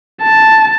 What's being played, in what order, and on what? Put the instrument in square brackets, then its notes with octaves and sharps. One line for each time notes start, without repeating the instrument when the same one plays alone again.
[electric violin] A5